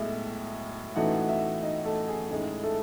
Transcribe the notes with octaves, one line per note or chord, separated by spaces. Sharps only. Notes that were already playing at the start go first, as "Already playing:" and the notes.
Already playing: B1 A2 G#3 E4 E5
A1 A2 E3 A3 D#4 F#4 F#5
E4 E5
D#4 D#5
A3 A4
G#4
A1 A2 G#3 D#4 G#4
A3 A4